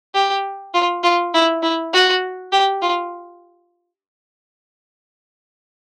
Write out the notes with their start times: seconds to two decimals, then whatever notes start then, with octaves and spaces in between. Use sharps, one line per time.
0.15 G4
0.74 F4
1.04 F4
1.34 E4
1.63 E4
1.94 F#4
2.53 G4
2.82 F4